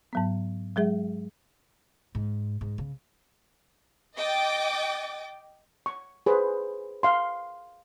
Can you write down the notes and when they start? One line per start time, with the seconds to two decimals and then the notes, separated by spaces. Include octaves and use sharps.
0.13 G#2 F#3 B3
0.76 F#3 G#3 G#4 E5
2.15 G#2
2.61 G#2
2.78 C#3
4.17 D#5 G5 D6 A6
5.86 C#6
6.26 G#4 B4 C5
7.03 F5 C6